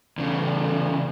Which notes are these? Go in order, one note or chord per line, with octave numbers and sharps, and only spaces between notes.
E2 C#3